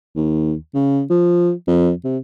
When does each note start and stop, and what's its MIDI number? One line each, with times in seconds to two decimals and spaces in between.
0.16 0.54 39
0.74 1.03 49
1.10 1.51 53
1.67 1.92 41
2.04 2.18 48